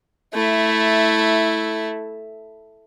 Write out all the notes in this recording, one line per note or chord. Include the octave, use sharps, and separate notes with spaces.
A3 E4